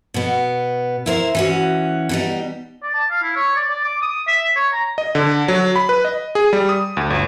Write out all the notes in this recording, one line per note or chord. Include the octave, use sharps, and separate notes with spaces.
B2 B3
E4 A#4 C5
E3 C#4 F#4
B2 G3 D#4
D5
A5
F5
E4
C#5
D5
D5
D6
D#6
E5
C#5
A#5
D#5
D3
F#3
B5
B4
D#5
G#4
G3
D#6
D2
G1